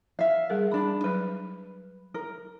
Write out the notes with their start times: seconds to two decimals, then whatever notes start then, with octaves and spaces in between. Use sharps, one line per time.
0.19 E5 F5
0.50 G3 G#4 A#4
0.71 D4 B5
1.04 F#3 B4 B5
2.14 A#4